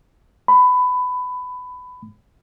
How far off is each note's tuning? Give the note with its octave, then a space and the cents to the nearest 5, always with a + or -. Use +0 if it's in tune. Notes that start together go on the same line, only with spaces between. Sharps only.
B5 +20